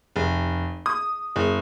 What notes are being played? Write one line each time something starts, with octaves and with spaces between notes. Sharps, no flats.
F1
D#6
F#1